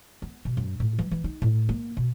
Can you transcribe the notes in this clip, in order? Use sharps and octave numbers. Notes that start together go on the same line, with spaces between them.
B3
B2
F#2
A2
E3
E3
D#4
A2
A#3
B2